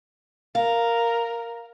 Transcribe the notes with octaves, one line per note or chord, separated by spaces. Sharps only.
A#4 F5